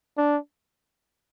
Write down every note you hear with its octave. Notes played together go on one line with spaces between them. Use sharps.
D4